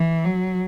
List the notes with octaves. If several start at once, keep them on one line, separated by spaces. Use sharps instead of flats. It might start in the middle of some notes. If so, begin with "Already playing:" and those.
Already playing: E3
F#3